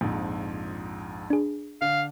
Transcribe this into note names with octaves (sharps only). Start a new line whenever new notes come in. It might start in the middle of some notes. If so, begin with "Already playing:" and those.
A#1 F2 G#2
D4 G#4
D3 F5